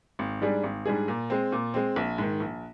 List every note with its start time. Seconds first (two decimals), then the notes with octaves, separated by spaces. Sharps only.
0.19 G#1
0.41 G#2 G3 D4 G#4
0.63 G#1
0.85 G#2 G3 D4 G#4
1.08 A#2
1.30 G#3 C4
1.52 A#2
1.74 G#3 C4
1.96 A#1
2.18 G#2 D#3
2.40 A#1